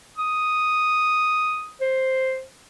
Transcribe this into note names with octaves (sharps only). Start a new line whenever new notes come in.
D#6
C5